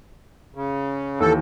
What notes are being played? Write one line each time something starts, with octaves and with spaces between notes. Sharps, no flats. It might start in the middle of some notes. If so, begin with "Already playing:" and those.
C#3
D#2 E3 A4 G6